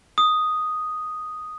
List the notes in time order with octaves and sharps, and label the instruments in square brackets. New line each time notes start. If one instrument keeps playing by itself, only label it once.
[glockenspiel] D#6